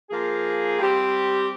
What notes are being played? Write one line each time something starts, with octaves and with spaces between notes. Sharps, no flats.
F3 A#3 F4 G#4
G3 C4 G4